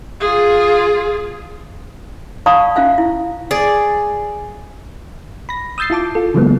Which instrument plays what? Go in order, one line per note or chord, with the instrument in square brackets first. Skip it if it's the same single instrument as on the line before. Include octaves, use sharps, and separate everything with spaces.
[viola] F4 G#4
[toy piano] D5 F5 A5 B5 C#6 D#6
C#4 F4 E5 F5 G#5
E4
[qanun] G#4 D5
[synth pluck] B5 A#6
D#6 E6 G6 A6 C7
E4 F4 A5 D6
F4 A4
C#3 E3 F#3 G#3 A#3 B3